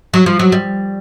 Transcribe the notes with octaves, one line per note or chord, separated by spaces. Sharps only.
F#3
F3
F#3
G3